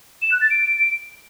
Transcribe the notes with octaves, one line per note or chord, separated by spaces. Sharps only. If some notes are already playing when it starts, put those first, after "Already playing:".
E7
F#6
A6
D7